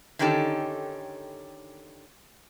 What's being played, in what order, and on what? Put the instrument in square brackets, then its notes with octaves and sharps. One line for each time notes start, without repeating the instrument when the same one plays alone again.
[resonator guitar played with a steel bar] D3 D#3 C#4 D#4 G4 A4